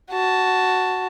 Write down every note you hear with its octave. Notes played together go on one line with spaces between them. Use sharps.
F#4 A5